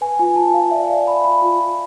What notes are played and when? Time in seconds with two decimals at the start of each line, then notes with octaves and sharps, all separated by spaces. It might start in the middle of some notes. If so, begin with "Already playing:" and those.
0.01 B4 G#5
0.19 F4 G#5
0.36 F4 A5
0.54 F4 F5
0.71 D5 E5
0.85 G#5
0.89 D5 F5
1.06 D5 B5
1.24 F4 B5
1.42 F4 B5
1.60 F4